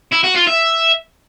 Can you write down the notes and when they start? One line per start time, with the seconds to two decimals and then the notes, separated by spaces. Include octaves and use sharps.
0.12 E4
0.24 F#4
0.36 F4
0.47 E5